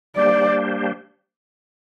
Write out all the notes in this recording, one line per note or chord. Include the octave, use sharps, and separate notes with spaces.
G3 A#3 D4 G4 C5 D5